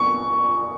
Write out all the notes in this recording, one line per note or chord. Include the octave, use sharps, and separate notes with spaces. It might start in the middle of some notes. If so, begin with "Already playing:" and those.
Already playing: C#6